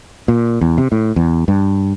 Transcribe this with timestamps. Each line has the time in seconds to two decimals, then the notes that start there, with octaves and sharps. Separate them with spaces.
0.28 A#2
0.61 E2
0.78 C3
0.92 A2
1.16 E2
1.48 G2